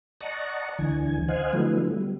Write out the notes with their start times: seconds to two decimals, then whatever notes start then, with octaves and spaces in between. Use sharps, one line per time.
0.21 D5 D#5 F#5 A5 A#5 C#6
0.79 D2 D3 E3 G#5
1.28 C5 D#5 F5 F#5 G#5
1.53 D3 F3 F#3 A3 B3 E4
1.91 G3